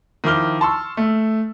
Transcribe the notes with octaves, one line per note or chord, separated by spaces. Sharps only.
D#3 F3 E4 D6 F6 G7
A5 C6 C#6 E6
A3